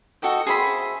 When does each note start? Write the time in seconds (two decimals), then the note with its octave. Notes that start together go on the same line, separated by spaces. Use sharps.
0.22 F#4 A4 D#5 G5
0.47 G#4 C5 E5 B5